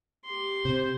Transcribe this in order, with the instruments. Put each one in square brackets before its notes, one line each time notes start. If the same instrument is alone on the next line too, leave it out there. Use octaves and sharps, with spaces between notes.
[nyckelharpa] G4 C6
[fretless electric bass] C3 [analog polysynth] C5